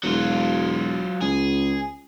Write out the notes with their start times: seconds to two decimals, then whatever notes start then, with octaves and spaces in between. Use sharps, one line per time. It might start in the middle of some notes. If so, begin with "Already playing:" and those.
0.04 E1 F#3 F4
1.21 C#2 G#4